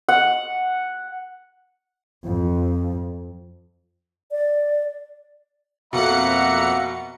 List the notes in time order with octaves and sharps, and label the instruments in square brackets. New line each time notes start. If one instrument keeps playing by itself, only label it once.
[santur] F#5
[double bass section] F2
[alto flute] D5
[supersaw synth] F2 F#5 C#7 [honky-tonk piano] B2 [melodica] A#3 [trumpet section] E5 A#5